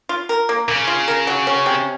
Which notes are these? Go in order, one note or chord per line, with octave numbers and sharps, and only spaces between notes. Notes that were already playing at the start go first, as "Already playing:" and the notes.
F4
A#4
A#3
C#3 A#3
F4
A#4
F#3
C#4
C3